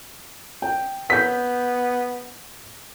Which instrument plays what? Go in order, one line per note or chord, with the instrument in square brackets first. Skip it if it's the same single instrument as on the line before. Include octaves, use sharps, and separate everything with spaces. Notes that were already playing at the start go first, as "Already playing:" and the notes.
[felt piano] G5
[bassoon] B3 [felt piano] G6 B6